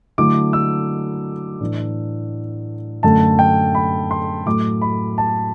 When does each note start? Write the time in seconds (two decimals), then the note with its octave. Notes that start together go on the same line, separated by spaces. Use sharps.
0.18 D3 F#3 A3 E4 D6
0.53 E6
1.61 A2 E3 A3 D4
3.03 F#2 D3 A3 A5
3.39 G5
3.75 B5
4.11 C6
4.46 A2 F#3 A3 D6
4.82 B5
5.18 A5